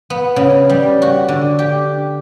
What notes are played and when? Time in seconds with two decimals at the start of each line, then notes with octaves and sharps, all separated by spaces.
0.10 B3
0.36 C#3
0.69 G3
1.02 F#4
1.28 D3
1.59 G4